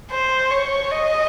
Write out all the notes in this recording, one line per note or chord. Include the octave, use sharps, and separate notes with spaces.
C5
C#5
D#5